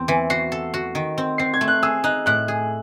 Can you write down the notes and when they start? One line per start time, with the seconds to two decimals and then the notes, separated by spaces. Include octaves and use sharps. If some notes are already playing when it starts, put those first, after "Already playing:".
Already playing: E2 C4
0.08 E3
0.30 F#4 C7
0.52 A4
0.74 F#4
0.95 D#3
1.18 C4
1.38 C4 C7
1.54 G#6
1.61 A3
1.68 F#6
1.83 G#4 E6
2.04 D#4 F#6
2.26 A2 F#6
2.48 G#4